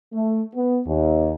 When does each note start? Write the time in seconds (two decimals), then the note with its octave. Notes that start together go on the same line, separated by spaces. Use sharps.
0.13 A3
0.55 B3
0.87 D#2